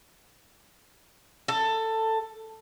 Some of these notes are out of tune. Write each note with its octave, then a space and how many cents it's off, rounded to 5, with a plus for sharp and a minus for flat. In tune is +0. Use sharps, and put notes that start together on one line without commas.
A4 +15